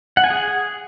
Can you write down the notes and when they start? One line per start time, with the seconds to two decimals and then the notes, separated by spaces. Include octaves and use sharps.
0.17 F#5
0.24 G#5
0.30 G#4